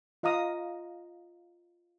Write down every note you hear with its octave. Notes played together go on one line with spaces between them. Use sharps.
F4 D#5 F5 A#5 D#6